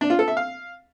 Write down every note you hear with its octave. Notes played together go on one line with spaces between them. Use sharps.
D4
F4
A4
E5
F5